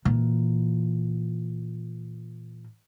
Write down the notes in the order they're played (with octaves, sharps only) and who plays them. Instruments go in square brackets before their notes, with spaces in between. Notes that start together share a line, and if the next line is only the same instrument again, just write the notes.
[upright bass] A#2 E3